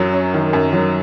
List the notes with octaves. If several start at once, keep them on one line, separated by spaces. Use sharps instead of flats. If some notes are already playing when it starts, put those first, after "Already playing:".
Already playing: F#2 F#3
C#4
D#3
F#2
F#3